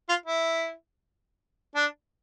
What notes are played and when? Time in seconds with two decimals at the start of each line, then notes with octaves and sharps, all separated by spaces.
0.09 F4
0.26 E4
1.75 D4